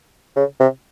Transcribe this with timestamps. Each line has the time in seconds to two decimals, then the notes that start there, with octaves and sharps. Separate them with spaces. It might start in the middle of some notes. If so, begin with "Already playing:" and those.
0.36 C#3
0.60 C3